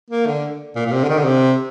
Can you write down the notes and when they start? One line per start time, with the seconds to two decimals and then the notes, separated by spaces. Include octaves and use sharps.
0.10 A#3
0.27 D3
0.75 A#2
0.86 A#2
0.91 C3
1.03 D3
1.08 D#3
1.18 D3
1.25 C3